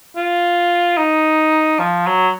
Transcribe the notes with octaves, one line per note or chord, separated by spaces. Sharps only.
F4
D#4
F3
F#3